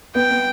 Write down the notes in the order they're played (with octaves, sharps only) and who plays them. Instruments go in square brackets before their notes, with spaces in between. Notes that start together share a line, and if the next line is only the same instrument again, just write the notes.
[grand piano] B3 [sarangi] G5
[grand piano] B3